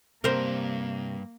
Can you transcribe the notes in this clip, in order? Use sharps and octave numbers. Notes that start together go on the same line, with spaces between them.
G2 C3 A#3 A#4 C5